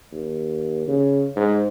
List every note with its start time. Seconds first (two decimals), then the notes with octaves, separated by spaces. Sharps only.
0.12 D#2
0.88 C#3
1.36 G#2